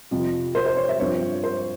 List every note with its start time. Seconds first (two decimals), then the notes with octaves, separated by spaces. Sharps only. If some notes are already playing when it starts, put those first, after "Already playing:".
0.11 F2 C3 F3
0.55 C5
0.66 C5
0.77 C#5
0.89 E5
1.00 G2 F3 C4 C#5
1.44 C5